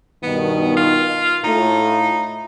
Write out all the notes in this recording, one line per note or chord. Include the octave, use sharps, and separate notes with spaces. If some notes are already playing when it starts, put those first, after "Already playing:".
G2 B2 D#3 B3
F4
A2 D#4 F4